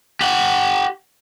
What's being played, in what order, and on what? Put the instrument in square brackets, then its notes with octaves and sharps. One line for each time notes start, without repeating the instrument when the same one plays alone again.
[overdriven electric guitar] G4 F#5